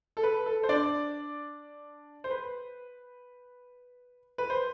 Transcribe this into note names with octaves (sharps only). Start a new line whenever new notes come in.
A4
B4
A4
C5
D4 D5
C5
B4
B4
C5